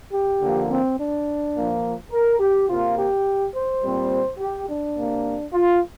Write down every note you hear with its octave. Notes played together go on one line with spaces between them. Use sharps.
G4
D3 F3 A#3
C4
D4
A#2 F3 A#3
A#4
G4
C3 A#3 F4
G4
C5
A#2 G3 C4
G4
D4
C3 A#3
F4